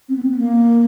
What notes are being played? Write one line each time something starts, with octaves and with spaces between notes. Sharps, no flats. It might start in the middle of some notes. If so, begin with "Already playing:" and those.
C4
B3
C4
B3
A#3